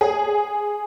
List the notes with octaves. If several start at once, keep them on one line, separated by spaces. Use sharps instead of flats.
G#4